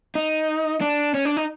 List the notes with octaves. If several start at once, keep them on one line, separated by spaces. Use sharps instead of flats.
D#4
D4
C#4
D4
D#4